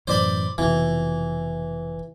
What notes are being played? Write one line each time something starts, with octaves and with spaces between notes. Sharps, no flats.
F#2 A2 E3 C5 D5 B5
F1 F2 B2 E3